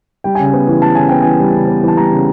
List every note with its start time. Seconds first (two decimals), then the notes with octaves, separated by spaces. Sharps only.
0.24 G3 G5
0.35 C#3 G#5
0.46 G5
0.53 B3
0.68 E3
0.82 G3 A5
0.95 C#3 G#5
1.09 B3 G5
1.22 E3 G#5
1.40 G3
1.54 C#3
1.68 B3
1.83 E3 A5
1.97 G3 A#5
2.11 C#3